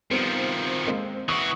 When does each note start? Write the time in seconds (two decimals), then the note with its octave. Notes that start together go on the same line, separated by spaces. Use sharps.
0.11 D#3 F3 G3 B3 C4
0.87 G#3 A#3 C4
1.28 E3 F#4 C#6 D#6